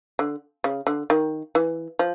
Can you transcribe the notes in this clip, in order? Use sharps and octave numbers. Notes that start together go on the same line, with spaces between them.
D3
C#3
D3
D#3
E3
F3